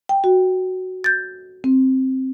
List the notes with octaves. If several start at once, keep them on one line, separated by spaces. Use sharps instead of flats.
G5
F#4
G6 A6
C4